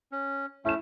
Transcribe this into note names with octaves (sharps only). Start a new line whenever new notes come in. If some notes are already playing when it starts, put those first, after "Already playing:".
C#4
A3 C#4 E4 E7